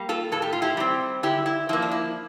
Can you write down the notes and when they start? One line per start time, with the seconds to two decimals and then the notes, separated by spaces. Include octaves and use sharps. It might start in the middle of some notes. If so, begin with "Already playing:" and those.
Already playing: G3 A#3
0.09 F4 A4
0.32 A2 A4
0.42 G4
0.53 F4
0.62 E4 G4
0.77 G3 C4
1.23 D3 E4 G4
1.46 E4
1.69 F3 A#3 E4
1.82 D4
1.91 E4